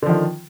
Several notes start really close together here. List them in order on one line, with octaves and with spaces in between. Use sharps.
D3 F3 D#3